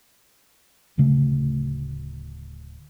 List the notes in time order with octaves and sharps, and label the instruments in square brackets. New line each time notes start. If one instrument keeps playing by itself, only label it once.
[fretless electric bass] D1 D2 C#3 A3